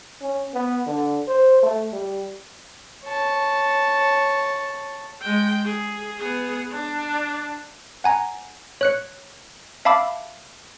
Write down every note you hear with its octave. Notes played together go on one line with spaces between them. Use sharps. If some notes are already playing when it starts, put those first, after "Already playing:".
C#4
B3
D3
C5
A3
G3
C#5 A5
G#3 G5
G#4
B3 G#4
D4 D5
F#5 G#5 A#5
C#5 F#6 C#7
E5 F5 A5 B5 D6 E6